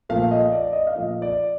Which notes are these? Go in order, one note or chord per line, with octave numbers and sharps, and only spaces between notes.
A#2 F3 A3 F5
D#5
D5
D#5
F5
A#2 F3 A3 D#5
D5